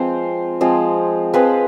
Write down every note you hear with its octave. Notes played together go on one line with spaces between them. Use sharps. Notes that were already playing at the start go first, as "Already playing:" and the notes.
Already playing: F3 G#3 C4 F4 C5
F3 G#3 C4 F4
F3 G#3 C4 F4 B4